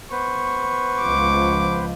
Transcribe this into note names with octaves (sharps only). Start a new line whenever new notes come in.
B3 B4 C5 C#6
C#2 F3 D6